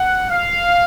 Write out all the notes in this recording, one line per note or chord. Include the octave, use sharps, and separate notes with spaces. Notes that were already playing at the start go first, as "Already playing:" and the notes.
Already playing: F#5
F5